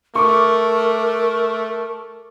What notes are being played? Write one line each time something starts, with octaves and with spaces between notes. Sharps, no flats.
A3 A#4 C#6 D6